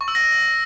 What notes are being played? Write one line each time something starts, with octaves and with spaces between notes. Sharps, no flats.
C#6
E6
A#6